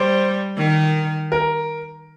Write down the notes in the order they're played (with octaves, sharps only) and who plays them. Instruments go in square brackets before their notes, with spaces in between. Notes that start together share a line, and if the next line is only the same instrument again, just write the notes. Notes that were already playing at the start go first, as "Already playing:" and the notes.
Already playing: [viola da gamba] G3 [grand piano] C5
[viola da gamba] D#3
[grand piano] A#4